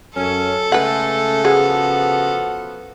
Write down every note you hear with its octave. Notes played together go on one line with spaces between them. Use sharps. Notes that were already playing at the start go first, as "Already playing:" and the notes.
F#2 C#4 A4
C#3 G#3 A3 B4 F#5
F3 B3 F#4 G#4